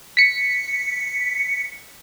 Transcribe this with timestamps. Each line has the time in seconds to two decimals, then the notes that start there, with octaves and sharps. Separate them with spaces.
0.17 B6 C#7